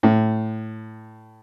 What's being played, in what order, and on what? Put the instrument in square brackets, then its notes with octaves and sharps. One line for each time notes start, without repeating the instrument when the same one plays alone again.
[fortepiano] A2